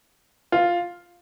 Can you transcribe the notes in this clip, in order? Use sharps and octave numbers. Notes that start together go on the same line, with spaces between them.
F4